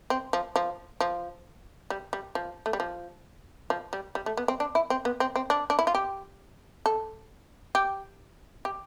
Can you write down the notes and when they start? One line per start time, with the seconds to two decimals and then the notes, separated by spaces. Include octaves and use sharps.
0.10 C4
0.33 F3
0.56 F3
1.00 F3
1.90 G3
2.13 G3
2.35 F3
2.66 A3
2.73 G3
2.80 F3
3.70 F3
3.93 G3
4.15 G3
4.26 A3
4.37 B3
4.48 C4
4.60 D4
4.75 E4
4.90 C4
5.05 B3
5.20 C4
5.36 C4
5.50 D4
5.70 D4
5.79 E4
5.87 F4
5.95 G4
6.86 A4
7.75 G4
8.65 G4